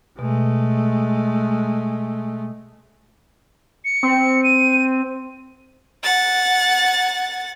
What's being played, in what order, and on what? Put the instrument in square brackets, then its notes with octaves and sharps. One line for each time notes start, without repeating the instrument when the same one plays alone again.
[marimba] B2 [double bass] G#3 A3
[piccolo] C#7
[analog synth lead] C4
[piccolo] D#7
[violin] F#5 A6